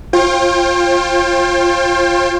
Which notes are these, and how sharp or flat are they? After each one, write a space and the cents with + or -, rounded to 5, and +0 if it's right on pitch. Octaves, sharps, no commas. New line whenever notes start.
F4 +0 C5 +45 G5 +25